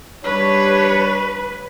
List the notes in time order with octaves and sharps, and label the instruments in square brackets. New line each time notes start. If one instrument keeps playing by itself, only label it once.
[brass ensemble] G3 D4 C#5 [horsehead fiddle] B4